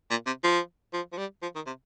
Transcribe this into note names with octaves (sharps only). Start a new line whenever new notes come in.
A#2
C3
F3
F3
F3
G3
F3
D#3
C3